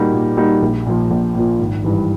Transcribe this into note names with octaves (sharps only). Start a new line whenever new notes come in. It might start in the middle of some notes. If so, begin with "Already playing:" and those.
Already playing: A#2 G3 A#3 D#4 F#4
A#2
G3 A#3 D#4 F#4
A#1
A#2 F3
A#1
A#2 F3
G#1
G2 E3